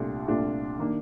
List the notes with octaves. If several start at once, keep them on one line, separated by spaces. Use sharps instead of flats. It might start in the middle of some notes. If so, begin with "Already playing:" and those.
Already playing: C2 A#2 A3 D4 F4
C2 A#2 A3 D4 F4
D#3 A#3 D4